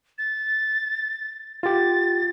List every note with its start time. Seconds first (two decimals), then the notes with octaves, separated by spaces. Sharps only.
0.18 A6
1.63 F4 G4 A6